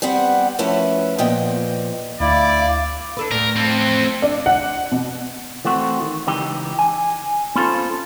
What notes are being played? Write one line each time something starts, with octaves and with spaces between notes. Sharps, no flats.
G3 B3 C4 B4 F#5
F3 A3 C#4 E4 B4 A5
A#2 F3 B3 D#5 G5
D2 E4 D5 F5
D4 A4 B4
A2 A3 A#4 D5
C4 A4
D4
F#5
B2
E3 A3 C4 F#4
D#3
C#2 E3 D#4 G4
G#5
B3 C#4 F4 A4 C5